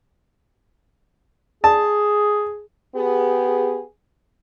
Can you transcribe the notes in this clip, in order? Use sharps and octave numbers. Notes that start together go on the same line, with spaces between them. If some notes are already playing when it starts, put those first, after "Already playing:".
G#4 A5
B3 G4 G#4